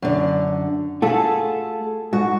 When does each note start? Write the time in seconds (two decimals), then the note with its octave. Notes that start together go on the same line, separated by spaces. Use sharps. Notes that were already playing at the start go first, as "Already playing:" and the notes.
0.02 F#2 D3
1.02 A3 F4 F#4 G#4 A4
2.13 G#2 F#4